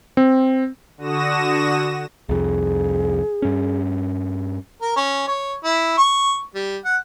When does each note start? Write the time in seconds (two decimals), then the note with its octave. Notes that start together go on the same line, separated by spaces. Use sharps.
0.17 C4
0.97 D3 F#4 D#6 A#6 E7
2.29 C2 F2 G#4
3.42 G2 C#4
4.82 A#4
4.96 C#4
5.28 C#5
5.64 E4
5.98 C#6
6.55 G3
6.85 F#5